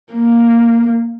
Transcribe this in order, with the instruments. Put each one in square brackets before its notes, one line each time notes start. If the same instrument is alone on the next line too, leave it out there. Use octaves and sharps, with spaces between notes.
[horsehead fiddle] A#3